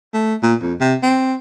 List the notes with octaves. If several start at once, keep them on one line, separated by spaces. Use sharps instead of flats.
A3
A#2
F2
C3
C4